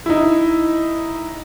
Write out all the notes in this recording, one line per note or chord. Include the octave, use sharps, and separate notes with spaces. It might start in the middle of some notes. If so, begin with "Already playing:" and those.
D#4 E4